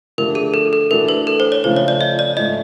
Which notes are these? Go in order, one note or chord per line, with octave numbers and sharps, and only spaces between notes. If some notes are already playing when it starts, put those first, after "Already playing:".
D3 F3 A3 D4 G4 A#4
G#4
A4
A4
E3 A3 D4 F#4 A#4
B4
A4
C5
C#5
C#3 F3 A3 C5
C#5
D5
D#5
D5
G#2 F3 A3 D#5